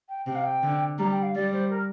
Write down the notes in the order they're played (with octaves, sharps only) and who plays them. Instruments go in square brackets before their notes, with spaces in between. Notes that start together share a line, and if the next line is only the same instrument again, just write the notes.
[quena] G5
[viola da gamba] C3 [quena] G5
[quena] F5
G5
[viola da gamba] D3
[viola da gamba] G3 [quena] A#5
[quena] G5
F5
[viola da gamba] G3 [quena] D5
[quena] C5
A#4